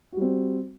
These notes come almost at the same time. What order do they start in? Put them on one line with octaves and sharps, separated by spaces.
F#4 G3 C4